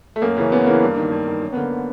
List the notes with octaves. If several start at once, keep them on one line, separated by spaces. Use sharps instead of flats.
A3
F#2 A#3
C#3 E3 C#4
F#2 B3
C#3 E3 A#3
G2
D#3
G2
D#3
F#2
B3
D3 A#3